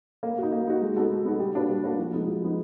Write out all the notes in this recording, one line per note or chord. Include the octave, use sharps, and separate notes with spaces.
A#3
D#4 F#4
A#3
D#4 F#4
G#3
B3 D#4 F#4 A4
G#3
B3 D#4 F#4 A4
G3
A#3 D4 F#4 B4
G3
A#3 D4 F#4 B4
F3
G#3 B3 D#4
F3
G#3 B3 D#4